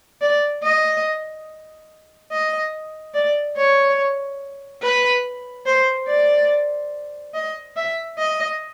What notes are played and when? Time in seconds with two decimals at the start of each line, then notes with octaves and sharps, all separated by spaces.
0.22 D5
0.63 D#5
2.32 D#5
3.14 D5
3.57 C#5
4.82 B4
5.66 C5
6.08 D5
7.34 D#5
7.76 E5
8.19 D#5